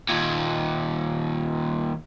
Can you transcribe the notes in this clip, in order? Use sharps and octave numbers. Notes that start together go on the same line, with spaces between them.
D#2 A#2